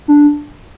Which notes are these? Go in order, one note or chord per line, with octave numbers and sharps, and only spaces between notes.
D4